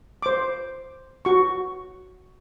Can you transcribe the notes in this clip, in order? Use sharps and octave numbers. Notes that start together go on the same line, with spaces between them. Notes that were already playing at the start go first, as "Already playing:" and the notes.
C5 D6
F#4 C#6